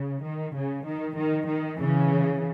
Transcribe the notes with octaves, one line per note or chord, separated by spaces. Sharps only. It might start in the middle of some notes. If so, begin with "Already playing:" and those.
Already playing: C#3
D#3
C#3
D#3
D#3
D#3
C#3 E3